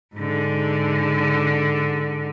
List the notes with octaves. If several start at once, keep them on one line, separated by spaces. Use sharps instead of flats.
G#2 D3